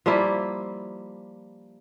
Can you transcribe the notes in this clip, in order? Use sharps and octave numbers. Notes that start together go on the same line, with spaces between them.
F3 G3 A#3 E4